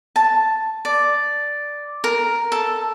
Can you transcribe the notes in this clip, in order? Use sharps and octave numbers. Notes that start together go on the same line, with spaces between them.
A5
D5
A#4
A4